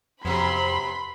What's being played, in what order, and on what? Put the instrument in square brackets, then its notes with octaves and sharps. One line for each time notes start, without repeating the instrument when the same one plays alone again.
[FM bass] F2 [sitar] C3 F#3 B3 [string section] B5 [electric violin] C6